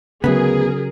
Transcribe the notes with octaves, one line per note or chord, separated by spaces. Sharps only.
D2 C#3 F#3 B3 G#4 A#4